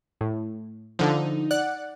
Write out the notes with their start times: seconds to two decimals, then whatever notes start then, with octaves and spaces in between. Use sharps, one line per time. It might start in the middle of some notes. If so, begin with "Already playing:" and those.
0.21 A2
0.99 D3 F3 D#4
1.51 D5 F#5 F#6